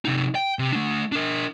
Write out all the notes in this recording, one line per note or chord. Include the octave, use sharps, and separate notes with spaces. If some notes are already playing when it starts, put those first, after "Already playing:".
C3 D#4
G5
C3
A3 D4
D4 A#4